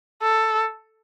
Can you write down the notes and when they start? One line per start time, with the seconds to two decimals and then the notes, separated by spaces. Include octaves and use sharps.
0.22 A4